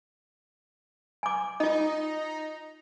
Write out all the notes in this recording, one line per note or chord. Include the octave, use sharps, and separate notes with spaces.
G#5 D6
D#4 F4 D#5